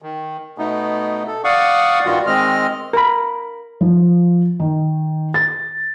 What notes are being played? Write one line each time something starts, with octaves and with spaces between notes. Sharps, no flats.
D#3
B2 A3 B3 D#4
A4
D5 F5 F#5 C#6 D#6
G2 D#3 G3 F4 F#4
D#3 G#3 C4 D#5 F6
A#4 B5
F3
D#3
A6